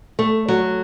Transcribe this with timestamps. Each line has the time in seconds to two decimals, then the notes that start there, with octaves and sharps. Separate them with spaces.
0.19 A3
0.48 F#3